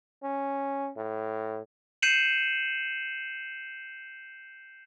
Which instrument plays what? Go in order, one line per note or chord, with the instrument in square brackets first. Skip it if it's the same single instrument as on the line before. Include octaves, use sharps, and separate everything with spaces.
[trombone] C#4
A2
[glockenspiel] G6 C7 C#7 D#7 E7 F#7